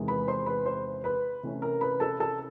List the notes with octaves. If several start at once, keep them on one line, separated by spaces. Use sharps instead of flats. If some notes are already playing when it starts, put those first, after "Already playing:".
Already playing: E2 C3 D#3 G#3
B4 B5
C5 C6
B4 B5
C5 C6
B4 B5
C3 E3 A3 C#4 E4
A#4 A#5
B4 B5
A4 A5
A4 A5